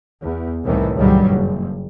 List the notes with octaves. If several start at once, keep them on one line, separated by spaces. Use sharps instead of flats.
E2
C2 A2 D#3 E3
C#2 G2 A#2 D#3 F#3 G3
F#1